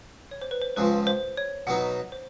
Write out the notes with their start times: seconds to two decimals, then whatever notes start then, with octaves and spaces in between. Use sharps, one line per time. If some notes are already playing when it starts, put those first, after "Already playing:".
0.31 C#5
0.42 C5
0.51 B4
0.62 C5
0.76 C#2 C#3 F3 B4
1.07 C5
1.37 C#5
1.67 B2 F#3 B3 D#4 F#5
2.12 C5